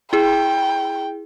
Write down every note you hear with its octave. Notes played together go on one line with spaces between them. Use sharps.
E4 G#4 G5